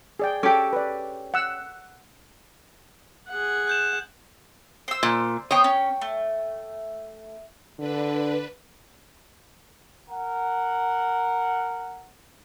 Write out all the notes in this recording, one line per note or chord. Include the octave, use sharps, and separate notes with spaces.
G#4 D5 G5
C#4 G4 A4 D6
B4 D5
F#5 E6
G#4 F#5
F#6 G6 E7
C5 E6
A#2
B3 C5 C#5 G5 D#6
C#4
A3
D3 D4 B4
A#4 F#5